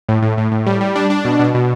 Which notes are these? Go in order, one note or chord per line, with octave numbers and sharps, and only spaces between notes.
A2
A2
A2
A2
G3
G3
D4
D4
B2
B2
B2